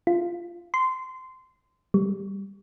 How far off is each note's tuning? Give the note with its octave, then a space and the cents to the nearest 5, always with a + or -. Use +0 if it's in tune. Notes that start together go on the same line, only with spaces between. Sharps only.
F4 -15
C6 -20
G3 +5